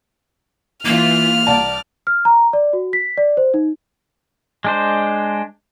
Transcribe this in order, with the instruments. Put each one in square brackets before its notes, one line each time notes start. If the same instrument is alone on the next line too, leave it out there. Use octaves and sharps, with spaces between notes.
[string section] E3 F4 [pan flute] A#3 [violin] F6
[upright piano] C2 A5 [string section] D5
[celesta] F6
A#5
D5
F#4
B6
D5
C5
D#4
[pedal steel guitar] G#3 D4 C5